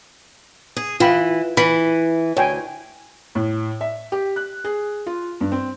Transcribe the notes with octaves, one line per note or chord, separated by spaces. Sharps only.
G#4
E3 F4 G5 B5
E3 B5
D2 C#5 G5 G#5
A2
E5
G4
F#6
G#4
F4
G2
C4